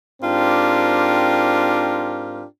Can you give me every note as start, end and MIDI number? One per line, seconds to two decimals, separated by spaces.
0.22 2.44 44
0.22 2.44 60
0.22 2.44 62
0.22 2.44 65
0.22 2.44 67
0.22 2.44 70